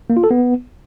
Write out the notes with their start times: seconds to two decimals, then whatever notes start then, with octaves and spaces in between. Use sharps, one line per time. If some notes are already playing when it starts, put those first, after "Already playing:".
0.10 A#3
0.17 F4
0.24 A4
0.31 B3